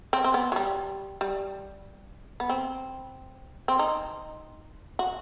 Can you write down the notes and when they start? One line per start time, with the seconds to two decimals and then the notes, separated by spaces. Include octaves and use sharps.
0.13 C4
0.24 C4
0.34 B3
0.52 F#3
0.56 G3
1.21 G3
2.40 B3
2.49 C4
3.68 C4
3.79 D#4
4.99 F#4